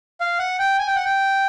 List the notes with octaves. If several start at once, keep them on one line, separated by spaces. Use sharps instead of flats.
F5
F#5
G5
G#5
G5
F#5
G5